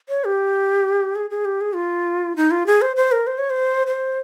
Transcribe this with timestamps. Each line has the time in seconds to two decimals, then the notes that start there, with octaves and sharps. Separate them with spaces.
0.09 C#5
0.25 G4
1.16 G#4
1.30 G#4
1.45 G4
1.61 G#4
1.75 F4
2.36 D#4
2.51 F4
2.67 G#4
2.82 C5
2.96 C5
3.12 A#4
3.27 C5
3.38 C#5
3.50 C5
3.87 C5